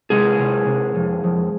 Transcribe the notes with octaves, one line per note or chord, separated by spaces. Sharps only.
C3 G#3 G#4
C3
C3
F2
F2